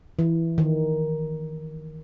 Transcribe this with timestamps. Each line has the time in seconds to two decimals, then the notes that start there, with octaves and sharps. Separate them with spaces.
0.19 E3
0.58 D#3